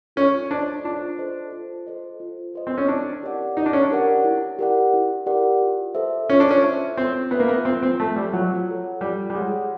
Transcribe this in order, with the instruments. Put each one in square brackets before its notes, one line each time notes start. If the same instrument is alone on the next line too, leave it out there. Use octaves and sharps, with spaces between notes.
[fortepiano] C#4 [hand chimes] F4
[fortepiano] D4 [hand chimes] A4 C5 D#5
[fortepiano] D4 [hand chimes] F4
[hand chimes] A4 C5 D#5
F4
A4 C5 D#5
F4
A4 C5 D#5
[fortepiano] C4
C#4
[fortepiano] D4 [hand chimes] E4
[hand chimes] G4 A#4 D5 F#5
[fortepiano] D#4 [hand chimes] E4
[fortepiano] D4
C#4
D4
[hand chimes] G4 A#4 D5 F#5
E4
G4 A#4 D5 F#5
E4
G4 A#4 D5 F#5
F4
A4 C5 E5
[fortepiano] C#4 [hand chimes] F4
[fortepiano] D4
C#4
[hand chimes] A4 C5 E5
[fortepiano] C4 [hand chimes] F4
[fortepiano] B3 [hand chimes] A4 C5 E5
[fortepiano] A#3
B3
[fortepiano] C4 [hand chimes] F4
[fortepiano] C4
[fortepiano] A3 [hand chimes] A4 C5 E5
[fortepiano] G3
[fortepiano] F#3 [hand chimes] F4
[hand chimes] A4 C#5 F#5
[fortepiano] G3 [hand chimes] F4
[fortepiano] G3
[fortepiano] G#3 [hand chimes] A4 C#5 F#5